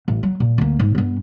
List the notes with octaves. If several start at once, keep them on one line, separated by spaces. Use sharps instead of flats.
A1
F#3
A#2
D2 A#3
G#2
G2 B3